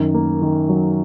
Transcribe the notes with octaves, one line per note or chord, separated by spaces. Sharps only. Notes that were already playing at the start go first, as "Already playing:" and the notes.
Already playing: F#2 D#3
A#3
D#3
F#3